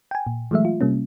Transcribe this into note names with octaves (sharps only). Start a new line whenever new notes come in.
G5 G#5
A#2
E3 F#3 G#3 A3 E5
F4
C3 G3 A#3 C#4